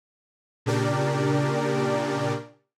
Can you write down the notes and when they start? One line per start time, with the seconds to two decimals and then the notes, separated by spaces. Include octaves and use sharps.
0.66 A#2 C#3 D4 G4 A#4 D5